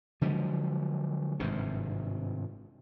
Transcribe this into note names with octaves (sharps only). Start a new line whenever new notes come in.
D3 F3 F#3 G#3
G#1 G2 C3